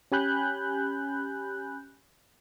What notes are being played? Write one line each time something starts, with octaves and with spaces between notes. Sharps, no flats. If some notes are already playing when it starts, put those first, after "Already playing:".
C#4 G4 G#5 B5 F#6 G6